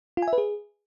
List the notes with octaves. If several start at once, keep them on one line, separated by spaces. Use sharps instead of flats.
F4
G#5
E5
B4
G#4